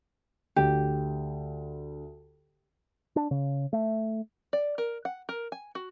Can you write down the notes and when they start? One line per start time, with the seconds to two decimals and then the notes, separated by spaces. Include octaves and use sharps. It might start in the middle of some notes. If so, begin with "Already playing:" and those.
0.56 D2 G4
3.16 D4
3.31 C#3
3.73 A3
4.53 D5
4.78 A#4
5.05 F#5
5.29 A#4
5.52 G#5
5.75 F#4